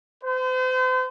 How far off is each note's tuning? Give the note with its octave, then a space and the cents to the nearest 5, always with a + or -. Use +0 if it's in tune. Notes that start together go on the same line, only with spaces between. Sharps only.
C5 -40